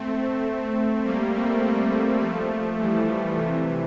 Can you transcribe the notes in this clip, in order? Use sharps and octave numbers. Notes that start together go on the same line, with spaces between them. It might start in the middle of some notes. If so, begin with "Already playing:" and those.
Already playing: A3 C4
G3 A#3
A3 C4
G3 A#3
F3 A3
E3 G3
C3 E3